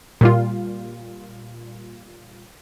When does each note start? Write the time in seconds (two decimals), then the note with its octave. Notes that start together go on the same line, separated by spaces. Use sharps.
0.21 A#2 G3 F4